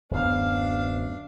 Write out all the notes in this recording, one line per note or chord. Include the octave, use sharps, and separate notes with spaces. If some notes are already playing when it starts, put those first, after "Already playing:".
D1 F#2 B3 D4 F5